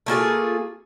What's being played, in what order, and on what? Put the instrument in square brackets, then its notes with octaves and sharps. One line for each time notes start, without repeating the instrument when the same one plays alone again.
[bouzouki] A3 A#3 F4 G#4